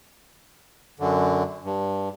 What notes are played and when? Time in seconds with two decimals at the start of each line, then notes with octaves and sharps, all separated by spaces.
1.00 F#2 D3
1.64 G2